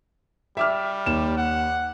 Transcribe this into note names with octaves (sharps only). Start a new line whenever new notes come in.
G3 E5 D6 F6
D#2 E7
F#5